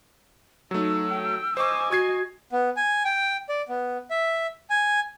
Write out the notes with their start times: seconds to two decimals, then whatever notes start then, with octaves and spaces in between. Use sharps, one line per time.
0.71 F#3 A3 D#4 E6
1.09 G5
1.57 C5 D#5 G#5 C#6 D6
1.91 F#4 C#6 G#6 C7
2.52 B3
2.76 G#5
3.05 G5
3.49 D5
3.69 B3
4.10 E5
4.70 G#5